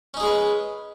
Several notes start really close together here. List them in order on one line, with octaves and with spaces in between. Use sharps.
C#4 D#4 G#4 G#3 B4